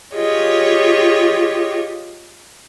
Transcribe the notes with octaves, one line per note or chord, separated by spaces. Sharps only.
F4 G4 G#4 C#5 D#5